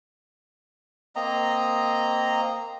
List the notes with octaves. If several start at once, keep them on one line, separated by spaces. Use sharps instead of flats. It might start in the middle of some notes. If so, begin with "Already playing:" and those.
A#3 C4 D#5 A#5